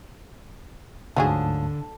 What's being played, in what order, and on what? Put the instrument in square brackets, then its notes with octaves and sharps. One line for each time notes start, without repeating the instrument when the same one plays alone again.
[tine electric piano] D2 G#2 A5 [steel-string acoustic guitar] D3 [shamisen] F3 F#3 G#4